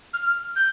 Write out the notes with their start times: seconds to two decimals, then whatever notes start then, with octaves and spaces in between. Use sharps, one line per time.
0.14 F6
0.56 G6